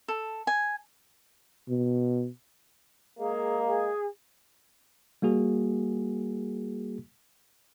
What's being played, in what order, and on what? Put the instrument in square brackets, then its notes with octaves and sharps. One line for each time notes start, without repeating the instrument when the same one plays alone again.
[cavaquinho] A4
G#5
[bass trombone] B2
[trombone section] G#3 A#3 [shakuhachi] G#4
[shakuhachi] G#4
[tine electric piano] G3 A#3 F#4 G#4